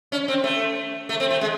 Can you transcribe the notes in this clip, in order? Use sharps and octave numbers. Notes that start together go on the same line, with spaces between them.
C#4
C4
A3
A3
C4
A3
G#3